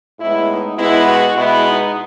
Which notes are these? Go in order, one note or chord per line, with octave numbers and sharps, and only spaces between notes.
A2 G#3 B3 E4
D#4
B2 G#3 B3 E4
F#4
B2 G#3 B3 E4
D#4